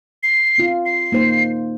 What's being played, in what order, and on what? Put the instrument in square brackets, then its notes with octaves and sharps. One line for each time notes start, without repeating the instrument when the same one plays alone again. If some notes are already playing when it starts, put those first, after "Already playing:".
[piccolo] C7
[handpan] C4 F4
[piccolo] C7
[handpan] A#3 D#4 C5